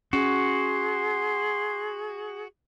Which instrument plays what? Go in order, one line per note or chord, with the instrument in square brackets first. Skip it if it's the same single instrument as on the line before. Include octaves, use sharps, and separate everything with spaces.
[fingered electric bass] C#4 [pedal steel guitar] F#4 [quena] G#4 [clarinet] C6